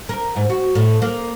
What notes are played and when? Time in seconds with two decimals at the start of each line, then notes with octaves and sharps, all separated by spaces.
0.09 A#4
0.36 G#2
0.50 F#4
0.75 A2
1.02 A#3